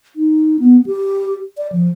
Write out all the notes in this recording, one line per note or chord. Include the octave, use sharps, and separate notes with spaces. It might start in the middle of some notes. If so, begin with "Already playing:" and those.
D#4
B3
G4
D5
F3